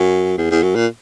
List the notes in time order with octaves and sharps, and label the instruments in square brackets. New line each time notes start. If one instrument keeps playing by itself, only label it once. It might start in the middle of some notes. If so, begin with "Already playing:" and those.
Already playing: [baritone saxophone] F#2
E2
E2
F#2
A#2